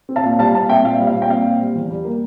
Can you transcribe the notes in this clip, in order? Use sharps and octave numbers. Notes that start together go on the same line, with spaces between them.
C4
F5 A5
A#2
G3 F5 A5
A#2 F5 A5
C4 E5 G5
A#2 F5
G3
F5
A#2
G5
C4 F5
A#2
G3
E2
G3
A#3